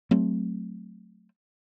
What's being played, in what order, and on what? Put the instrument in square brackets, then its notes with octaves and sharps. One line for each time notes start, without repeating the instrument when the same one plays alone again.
[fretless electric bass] F#3 A3 C4